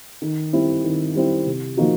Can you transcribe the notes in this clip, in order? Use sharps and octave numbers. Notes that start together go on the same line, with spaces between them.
D#3
G3 C4 E4
D#3
G3 C4 E4
C3
F3 A#3 D#4 F#4